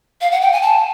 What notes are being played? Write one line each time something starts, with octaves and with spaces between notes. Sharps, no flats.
F5
F#5
G5
G#5
A5